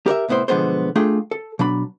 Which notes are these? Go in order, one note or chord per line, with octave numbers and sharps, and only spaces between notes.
G4 A#4 D5 E5
C2 A2 B3 E4 C5
B1 D3 F3 G#3 B3 C5
A3 D4 F4 G#4 G5
A4
B2 F#3 D4 B5